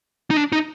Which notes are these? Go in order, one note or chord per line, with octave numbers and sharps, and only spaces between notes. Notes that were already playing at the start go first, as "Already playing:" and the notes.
D#4
D4
D#4